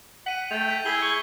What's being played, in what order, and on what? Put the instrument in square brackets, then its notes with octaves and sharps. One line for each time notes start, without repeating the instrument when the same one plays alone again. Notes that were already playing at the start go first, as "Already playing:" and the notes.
[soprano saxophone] F#5 [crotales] B6 D#7
[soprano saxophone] A3 [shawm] G5 [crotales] F7
[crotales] G6 B6
[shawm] E4 [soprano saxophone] G#4 [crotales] G#6 G7
[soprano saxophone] C#6